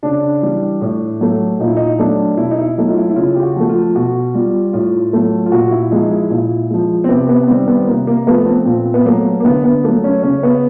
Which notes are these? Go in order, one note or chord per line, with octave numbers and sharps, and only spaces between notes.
C#3 D4
E3 G3
A2
F#3 A3
A#2 D#4
E4
D#4
F#3 A3 D4
B2 E4
D#4
E4
F#3 A3 D#4
F4
E4
E4
C#3 F4
G4
F#4
F3 A3
F4
B2 F#4
G3 F4
A2 F4
F#3 A3
F4
A#2 F#4
E4
F3 G#3 D#4
E4
A#2 E4
F3 G#3
C4
C3 B3
B3
B3
D#3 G3 C4
B3
C3 A#3
A#3
F3 A3 B3
C4
A#2 C4
B3
F#3 A3 A#3
A#3
D3 B3
B3
F#3 A3 A#3
C#4
C#3 C#4
B3